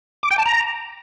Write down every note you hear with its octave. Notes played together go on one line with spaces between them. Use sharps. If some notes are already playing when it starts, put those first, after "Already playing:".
D6
G5
A5
A#5